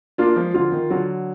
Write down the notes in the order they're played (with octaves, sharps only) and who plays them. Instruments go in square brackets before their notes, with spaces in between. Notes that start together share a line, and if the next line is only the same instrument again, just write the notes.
[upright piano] A#3 D4 [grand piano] F4
[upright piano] F3 G#3
[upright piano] D3 F3 [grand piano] F4
[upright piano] D#3
[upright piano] D3 [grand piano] F#3